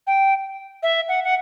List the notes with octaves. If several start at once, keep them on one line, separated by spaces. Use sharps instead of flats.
G5
E5
F#5
F#5